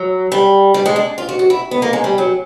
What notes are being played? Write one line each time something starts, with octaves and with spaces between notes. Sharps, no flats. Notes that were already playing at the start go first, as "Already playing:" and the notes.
Already playing: F#3
G3
G3
G#3
D4
F4
F#4
F#4
E4
B3
A#3
G#3
G3
F#3